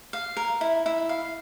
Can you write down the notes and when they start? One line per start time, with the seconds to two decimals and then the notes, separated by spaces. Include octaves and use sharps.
0.13 F5
0.37 A#4
0.61 E4
0.86 E4
1.09 F5